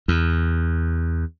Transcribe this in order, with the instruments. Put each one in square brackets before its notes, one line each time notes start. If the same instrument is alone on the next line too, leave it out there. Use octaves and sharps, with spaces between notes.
[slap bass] E2